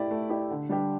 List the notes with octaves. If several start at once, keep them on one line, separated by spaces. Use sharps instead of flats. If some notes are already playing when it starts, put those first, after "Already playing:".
Already playing: A3 E4 G4 D5
A3
E4 G4 D5
D3
G3 D4 G4